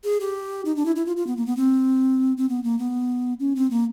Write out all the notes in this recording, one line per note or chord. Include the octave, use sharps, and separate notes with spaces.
G#4
G4
D#4
D4
E4
E4
F4
F4
B3
A#3
B3
C4
C4
B3
A#3
B3
C#4
C4
A#3